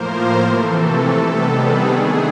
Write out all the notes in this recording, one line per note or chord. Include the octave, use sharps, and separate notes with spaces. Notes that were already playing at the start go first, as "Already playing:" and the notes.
Already playing: A2 F3 A#3 A#4 C5
C3 E3 A3 A4
A4
C3 D#3 G3 B3
G#4
D#3 F#3 A3 D4